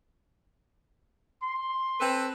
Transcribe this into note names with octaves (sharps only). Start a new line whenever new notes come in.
C6
C4 A4 B4